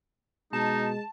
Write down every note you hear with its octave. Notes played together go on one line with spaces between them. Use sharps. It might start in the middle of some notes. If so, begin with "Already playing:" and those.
B2 G#3 D#4 A5